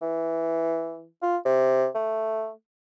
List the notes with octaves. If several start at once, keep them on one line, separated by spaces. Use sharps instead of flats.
E3
F4
C3
A3